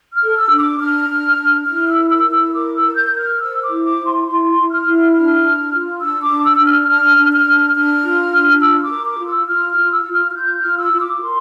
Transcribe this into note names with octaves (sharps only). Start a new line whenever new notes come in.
F6
A4
E6
D4
D6
D4 F6
D4
D4
E4 F6
E6
A#4
E6
E4
E6
A#4 D6
E6
A#4
G6
A#4
F6
C5 E6
D6
E4
D6
E4
C6
E4 C6
E4
F6
E4
D4 F6
D4
F4
D4 E6
D6
D4
E6
D4
F6
D4 F6
D4
F6
D4
D4 F6
F4
D4
F4 E6
D6
A#4
D6
F4
E6
F4 F6
F6
F4
E6
F4
F6
F6
F4 G6
F6
F4
E6
F4
D6
A#4 C6